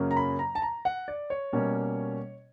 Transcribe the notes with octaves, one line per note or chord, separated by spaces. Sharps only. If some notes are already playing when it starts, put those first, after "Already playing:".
Already playing: F#2 C#3 F#3 A#3 C#4
A#5
B5
A#5
A5
A#5
F#5
D5
C#5
B2 G3 A#3 C#4